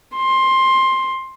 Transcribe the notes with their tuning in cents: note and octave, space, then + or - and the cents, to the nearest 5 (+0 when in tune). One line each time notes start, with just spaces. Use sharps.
C6 +15